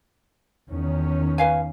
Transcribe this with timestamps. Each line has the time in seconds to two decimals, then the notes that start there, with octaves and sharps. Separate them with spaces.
0.69 E2 D#3 C#4
1.38 B4 F5 G#5